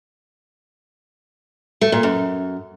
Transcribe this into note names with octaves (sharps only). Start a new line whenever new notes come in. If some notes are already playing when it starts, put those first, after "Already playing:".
A3
A#2
F#2